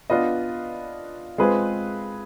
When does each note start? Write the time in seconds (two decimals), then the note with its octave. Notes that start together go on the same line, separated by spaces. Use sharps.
0.10 B3 D4 F4 B4 D#5
1.38 G#3 C4 F4 G#4 B4